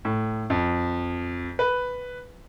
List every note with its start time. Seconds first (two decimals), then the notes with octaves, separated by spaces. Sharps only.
0.05 A2
0.50 F2
1.59 B4